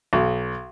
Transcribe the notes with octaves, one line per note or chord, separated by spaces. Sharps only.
B1